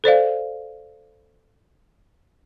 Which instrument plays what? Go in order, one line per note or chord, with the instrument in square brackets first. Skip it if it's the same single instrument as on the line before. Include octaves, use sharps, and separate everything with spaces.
[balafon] A4 C5 D5 F5